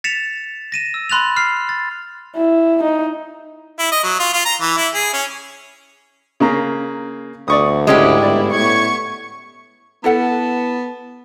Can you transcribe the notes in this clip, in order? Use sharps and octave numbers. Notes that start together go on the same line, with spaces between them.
A6 B6 C#7 E7 F7
A#6 D#7 E7
E6
B5 C6 F#6 A6 F7
F6 C7
A6
E4
D#4
E4
D#5
F#3
F4
F4
A#5
E3
E4
G#4
C#4
C#3 A#3 A#5
D2 D5 C#6 D#6
G#2 G#3 C#4 E4 G4
G1 D5
A2 B3 C#6 G#6
B3 E4 A4 F#5 A5